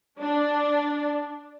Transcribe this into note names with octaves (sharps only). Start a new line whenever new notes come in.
D4